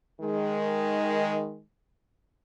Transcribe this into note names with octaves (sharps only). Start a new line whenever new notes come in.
D#3 G#3